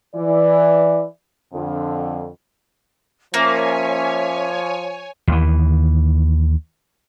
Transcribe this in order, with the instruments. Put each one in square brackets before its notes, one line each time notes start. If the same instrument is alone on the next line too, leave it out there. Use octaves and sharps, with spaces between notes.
[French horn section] E3 D5
F2 D3
[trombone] F3 [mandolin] A#3 [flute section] C#4 E5 [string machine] C#5 G#5
[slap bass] D#2 E3